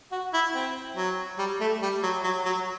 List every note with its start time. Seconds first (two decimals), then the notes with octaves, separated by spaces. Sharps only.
0.12 F#4
0.34 E4
0.54 C4
0.97 F#3
1.38 G3
1.61 A3
1.82 G3
2.03 F#3
2.24 F#3
2.45 F#3